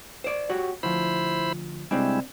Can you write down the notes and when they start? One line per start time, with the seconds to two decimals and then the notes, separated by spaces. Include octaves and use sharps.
0.24 C5 D5
0.50 F#4 G4 C#5
0.83 D2 F3 E4 C5 B5
1.91 C3 G3 G#3 C4 D4 E4